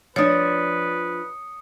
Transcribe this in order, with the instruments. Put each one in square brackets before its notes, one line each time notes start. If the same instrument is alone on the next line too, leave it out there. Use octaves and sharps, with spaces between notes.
[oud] F3 D4 [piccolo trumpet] B4 [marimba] C#5 [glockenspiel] D#6 C#7